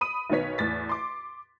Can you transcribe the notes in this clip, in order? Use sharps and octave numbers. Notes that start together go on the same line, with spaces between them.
B5 D#6 D#7
B1 D#3 B3 C#5 B6
E2 A2 A6 B6
C6 D6